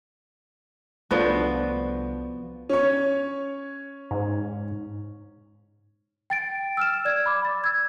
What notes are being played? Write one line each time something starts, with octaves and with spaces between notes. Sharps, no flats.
C2 F3 A3 B3 D4 F#4
C#4 C#5
G#2
G5 A6 D7
E6 F6 E7
D5 G#6
B5 D6
A6
E6 G#6